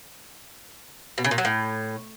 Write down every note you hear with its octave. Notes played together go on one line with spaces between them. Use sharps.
B2
C#3
A#2
F#3
A2